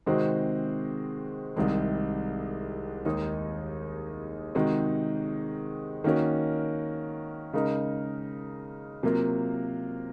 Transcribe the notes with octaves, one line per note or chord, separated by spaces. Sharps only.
C3 D#3 G#3 C4 F#4
C2 C3 D#3 G#3
D#2 D#3 G#3 D#4
C3 D#3 G#3 D#4 F#4
D#3 A#3 C#4 F#4 A#4
C#3 G#3 D#4 A#4
C3 F#3 A#3 F4 A#4